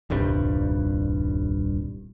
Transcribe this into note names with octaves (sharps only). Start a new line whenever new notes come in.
D#1 C2 G2 G3